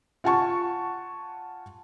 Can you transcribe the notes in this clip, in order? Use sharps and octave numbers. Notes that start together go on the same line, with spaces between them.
F4 F#5 G#5 A5 C#6